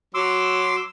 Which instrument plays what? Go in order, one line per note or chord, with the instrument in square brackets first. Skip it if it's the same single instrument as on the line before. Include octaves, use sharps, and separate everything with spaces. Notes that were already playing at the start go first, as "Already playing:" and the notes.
[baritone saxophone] F#3 [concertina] C6 D6 E6